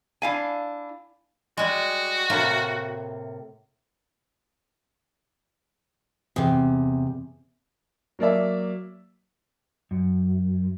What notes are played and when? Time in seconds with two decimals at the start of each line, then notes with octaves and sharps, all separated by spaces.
0.22 D4 E4 F5 G#5
1.57 G3 G#3 F#4
2.30 A2 C3 A#3
6.36 E2 C3
8.19 F#3 A#3 D5 E5
9.91 F#2